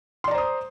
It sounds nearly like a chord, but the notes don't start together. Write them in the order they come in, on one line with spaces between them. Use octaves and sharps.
C6 D5 A#5 C5 D#6